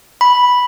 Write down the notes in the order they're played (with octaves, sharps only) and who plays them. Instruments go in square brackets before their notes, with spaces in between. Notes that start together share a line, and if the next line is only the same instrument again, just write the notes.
[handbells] B5